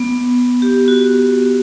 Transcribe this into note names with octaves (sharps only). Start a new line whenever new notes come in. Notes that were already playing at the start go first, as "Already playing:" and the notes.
Already playing: B3
G4
F#4